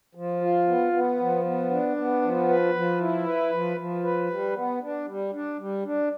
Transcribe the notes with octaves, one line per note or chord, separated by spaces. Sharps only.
F3
F4
B3
B3
F3
B3
D4
B3
F3
B4
F3
E4
B4
F3
F3
B4
G3
B3
D4
G3
D4
G3
D4